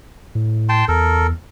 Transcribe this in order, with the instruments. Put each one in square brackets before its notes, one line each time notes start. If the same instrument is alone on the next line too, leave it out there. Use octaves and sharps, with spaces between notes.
[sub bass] A2
[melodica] G5 A5 C6
[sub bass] E2 [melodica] A4 A#4